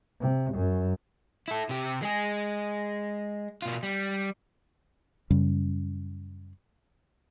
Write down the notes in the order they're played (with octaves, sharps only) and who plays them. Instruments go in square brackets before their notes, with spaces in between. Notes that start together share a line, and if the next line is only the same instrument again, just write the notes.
[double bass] C3
F#2
[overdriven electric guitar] E4 A4
C3 G4
G#3 G#4
B2 F4
G3
[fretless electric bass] F#2 C#3 G3 C#4